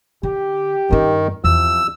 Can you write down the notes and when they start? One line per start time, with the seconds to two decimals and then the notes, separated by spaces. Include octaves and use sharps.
0.23 D3 G4
0.90 G2 D#3 C#4
1.44 E2 C3 F3 E6